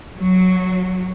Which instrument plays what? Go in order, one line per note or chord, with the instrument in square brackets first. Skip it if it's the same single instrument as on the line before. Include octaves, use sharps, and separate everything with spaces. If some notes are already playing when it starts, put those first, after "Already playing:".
[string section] F#3